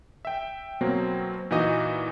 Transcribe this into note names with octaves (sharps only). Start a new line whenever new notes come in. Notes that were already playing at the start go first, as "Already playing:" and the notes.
E5 G5
B2 F#3 A#3 C4
A#2 E3 D#4 F#4 D#5 D#6